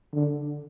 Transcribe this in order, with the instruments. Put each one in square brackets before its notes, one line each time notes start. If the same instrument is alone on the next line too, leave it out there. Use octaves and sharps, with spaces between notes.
[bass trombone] D3